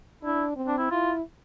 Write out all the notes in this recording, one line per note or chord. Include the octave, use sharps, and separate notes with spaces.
D4 E4
C4
D4
E4
E4 F4